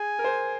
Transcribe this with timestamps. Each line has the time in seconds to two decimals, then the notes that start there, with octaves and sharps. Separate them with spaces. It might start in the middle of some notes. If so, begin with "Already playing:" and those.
Already playing: G#4 G#5
0.19 A#4
0.24 C5